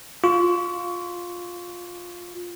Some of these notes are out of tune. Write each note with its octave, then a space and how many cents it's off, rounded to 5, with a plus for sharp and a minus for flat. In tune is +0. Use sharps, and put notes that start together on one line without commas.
F4 +10 C#6 +30